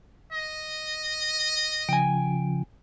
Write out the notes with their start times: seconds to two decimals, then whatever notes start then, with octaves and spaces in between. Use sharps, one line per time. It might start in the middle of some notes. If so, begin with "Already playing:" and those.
0.33 D#5
1.89 C#3 F3 G5 G#5